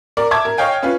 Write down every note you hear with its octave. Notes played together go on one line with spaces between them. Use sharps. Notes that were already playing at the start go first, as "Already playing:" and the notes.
A#4 D5
E5 A5 D6 G#6
A#4
C#5 D#5 F5 G5 G#5
C#4 F4 B4